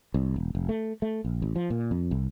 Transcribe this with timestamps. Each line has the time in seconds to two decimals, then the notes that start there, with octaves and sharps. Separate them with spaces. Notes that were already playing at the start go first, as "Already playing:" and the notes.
0.14 C2
0.36 E1
0.55 F1
0.69 A3
1.02 A3
1.25 A#1
1.42 A1
1.56 F3
1.70 A#2
1.91 F2
2.11 C2